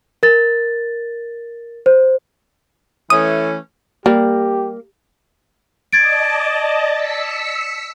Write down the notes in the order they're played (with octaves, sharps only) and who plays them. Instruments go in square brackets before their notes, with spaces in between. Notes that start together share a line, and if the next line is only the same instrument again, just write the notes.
[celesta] A#4 A6
C5
[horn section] E3 A3 C#4 [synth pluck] D#6
[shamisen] G3 [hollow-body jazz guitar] A#3 [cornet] G4
[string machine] D5 D#5 A5 [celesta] G#6 A6 D7
[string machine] E6 B6 C#7